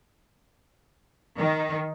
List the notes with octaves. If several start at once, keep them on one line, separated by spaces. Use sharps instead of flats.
D#3